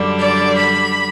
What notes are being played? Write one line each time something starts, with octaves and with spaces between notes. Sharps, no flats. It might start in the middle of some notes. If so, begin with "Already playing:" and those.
Already playing: F#2 D3 G3 D4
D5
B5